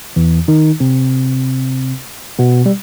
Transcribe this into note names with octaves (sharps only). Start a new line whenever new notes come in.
E2 E3
D#3 D#4
C3 C4
B2 B3
G3